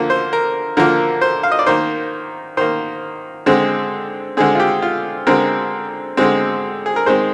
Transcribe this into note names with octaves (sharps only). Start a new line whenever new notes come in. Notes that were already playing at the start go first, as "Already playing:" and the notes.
Already playing: D3 F3 A#3
C5
A#4
D3 F3 A#3 A#4
C5
F5
D#5
D5
D#3 A#3 C5
D#3 A#3 C5
D3 G#3 C4
D3 G#3 C4 G#4
F4
G4
F4
D3 G#3 C4 A#4
D3 G#3 C4
G#4
A#4
D#3 G#3 C4 C5